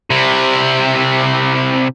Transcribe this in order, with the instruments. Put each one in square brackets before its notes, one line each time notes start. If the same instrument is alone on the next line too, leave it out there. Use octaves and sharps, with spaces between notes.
[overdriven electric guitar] C3 E4